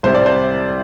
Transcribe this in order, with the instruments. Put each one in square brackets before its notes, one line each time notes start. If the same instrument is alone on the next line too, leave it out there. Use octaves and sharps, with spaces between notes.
[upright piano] C2 C3 G3 C5
D5
C5